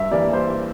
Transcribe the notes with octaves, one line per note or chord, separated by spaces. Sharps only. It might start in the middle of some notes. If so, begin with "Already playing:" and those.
Already playing: G2 E5
E3 G3 A#3 D5
C5